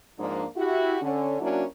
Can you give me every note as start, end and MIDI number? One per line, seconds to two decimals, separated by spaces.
0.19 0.44 44
0.19 0.44 53
0.19 0.44 58
0.19 0.44 62
0.56 0.96 64
0.56 0.96 66
0.56 0.96 67
1.01 1.40 50
1.01 1.40 61
1.41 1.63 54
1.41 1.63 58
1.41 1.63 61
1.41 1.63 62
1.41 1.63 64
1.41 1.63 66